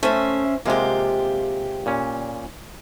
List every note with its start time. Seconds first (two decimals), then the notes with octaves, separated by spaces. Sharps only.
0.03 A3 C#4 C5 E5
0.66 C3 G#3 A#3 F4 G4
1.86 A#2 C#4